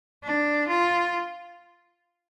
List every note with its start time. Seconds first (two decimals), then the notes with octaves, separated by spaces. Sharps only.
0.24 D4
0.68 F4